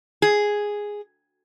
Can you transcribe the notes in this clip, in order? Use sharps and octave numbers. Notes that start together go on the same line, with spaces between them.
G#4